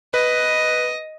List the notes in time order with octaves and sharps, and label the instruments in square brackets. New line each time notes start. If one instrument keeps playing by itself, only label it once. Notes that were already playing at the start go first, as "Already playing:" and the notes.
[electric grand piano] B4 [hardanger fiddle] D#5